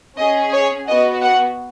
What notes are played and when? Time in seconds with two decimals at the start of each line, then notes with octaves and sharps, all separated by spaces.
0.18 C#4 G#4 D#5
0.53 C#5
0.88 B3 F#4 D#5
1.23 F#5